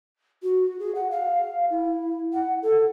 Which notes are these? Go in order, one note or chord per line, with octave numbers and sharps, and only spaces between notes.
F#4
G#4
F#5
F5
E4
F#5
A4